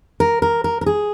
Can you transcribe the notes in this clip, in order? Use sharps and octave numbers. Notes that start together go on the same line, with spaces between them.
A#4
A#4
A#4
A#4
G#4